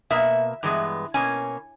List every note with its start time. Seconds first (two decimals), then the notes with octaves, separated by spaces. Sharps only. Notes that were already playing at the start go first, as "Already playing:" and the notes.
0.10 B2 A#3 E5
0.63 G2 E3 G#3 B3
1.14 B2 A#3 C#4 G#5